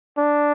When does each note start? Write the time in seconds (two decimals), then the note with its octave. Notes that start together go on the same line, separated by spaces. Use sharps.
0.18 D4